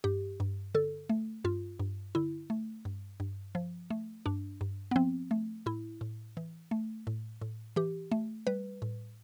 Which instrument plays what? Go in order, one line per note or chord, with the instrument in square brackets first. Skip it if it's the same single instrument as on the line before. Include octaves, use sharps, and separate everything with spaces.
[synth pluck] G2 G4
G2
D3 A4
A3
G2 F4
G2
D3 E4
A3
G2
G2
F3
A3
G2 D4
G2
B3
F3 C4
A3
A2 E4
A2
E3
A3
A2
A2
E3 G4
A3
G3 B4
A2